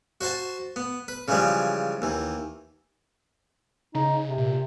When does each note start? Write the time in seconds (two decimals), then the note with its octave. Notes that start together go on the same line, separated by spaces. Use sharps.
0.21 F#4 C5 F#5 A5
0.76 B3
1.08 B4
1.28 C#3 E3 F3 G3 G#3
2.02 D#2 E3
3.95 C#3 D#4
4.25 C3
4.38 A#2